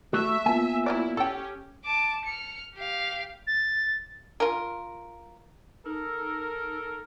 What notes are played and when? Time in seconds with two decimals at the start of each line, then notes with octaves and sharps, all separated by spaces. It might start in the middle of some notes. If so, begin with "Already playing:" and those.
0.13 A3 F#4 E5
0.46 A#3 B3 F4 G#5
0.86 F#3 E4 A#4 D5
1.17 C#4 G4 A4 G5
1.86 A5 D6
2.26 F6 C#7
2.75 G4 F5
3.47 A6
4.40 F4 A#4
5.86 D#4 A4 A#4